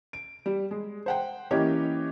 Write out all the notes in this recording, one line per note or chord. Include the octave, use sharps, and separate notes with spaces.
D7
G3
G#3
C5 F#5 G5
E3 A#3 C#4 G4 C#5 D#5